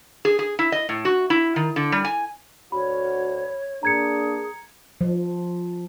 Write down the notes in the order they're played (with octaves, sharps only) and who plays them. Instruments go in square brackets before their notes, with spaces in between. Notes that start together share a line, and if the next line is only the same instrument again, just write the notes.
[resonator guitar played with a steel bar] G#4
G#4
E4
D#5
A2
F#4
E4
D#3
D3
G3
G#5
[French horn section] D2 D4 F#4 [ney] C#5 [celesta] B5
[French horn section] A#3 D4 [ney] G#4 [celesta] A#5 G#6 C#7
[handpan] F3